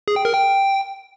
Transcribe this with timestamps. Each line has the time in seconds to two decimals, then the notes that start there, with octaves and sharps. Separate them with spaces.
0.08 G#4
0.16 G5
0.25 A#4
0.34 G5